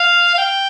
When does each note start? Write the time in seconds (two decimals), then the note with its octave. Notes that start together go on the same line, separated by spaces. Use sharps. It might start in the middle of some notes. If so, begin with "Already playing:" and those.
Already playing: F5
0.34 F5
0.38 G5